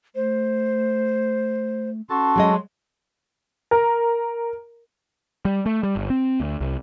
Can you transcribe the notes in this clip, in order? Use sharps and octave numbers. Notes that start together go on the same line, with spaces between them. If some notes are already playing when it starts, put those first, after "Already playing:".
A3 C5
C#4 F#4 A4 A5 C6
F#3 G#3 D#5
A#4
G3
A3
G3
G1
C4
D2
C2